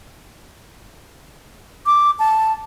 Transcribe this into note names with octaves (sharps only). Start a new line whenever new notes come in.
D6
A5